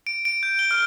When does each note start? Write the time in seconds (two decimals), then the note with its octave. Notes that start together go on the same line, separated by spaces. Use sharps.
0.07 D7
0.25 D7
0.43 G6
0.59 G7
0.71 F6